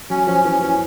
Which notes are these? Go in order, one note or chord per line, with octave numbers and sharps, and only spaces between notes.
F#3 C#4
F3 C#4
E3 C#4
E3 C#4